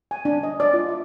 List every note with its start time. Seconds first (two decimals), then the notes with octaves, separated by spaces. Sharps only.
0.11 G#5
0.25 D4
0.43 D#5
0.60 D5
0.74 F4
0.89 E5